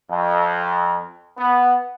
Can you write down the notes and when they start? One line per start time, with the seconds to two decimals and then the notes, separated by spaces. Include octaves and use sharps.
0.11 F2
1.37 B3